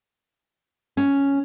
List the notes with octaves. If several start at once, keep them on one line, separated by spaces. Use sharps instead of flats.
C#4